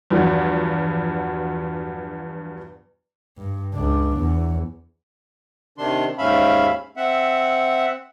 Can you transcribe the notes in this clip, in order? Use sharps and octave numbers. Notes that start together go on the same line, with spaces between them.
E2 G2 F3 F#3
G2
C#2 D4
E2
C3 D#3 D4 C6
D#2 G#2 C#4 E5 F5 B5
C4 E5 F#5